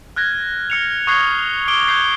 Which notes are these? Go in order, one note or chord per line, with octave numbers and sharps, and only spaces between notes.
F6 F#6 G#6 A#6
F6 C#7 F7
C#6 D#6 F#6 G#6 C7 G7
D6 D7 G7
G6 G#6 C7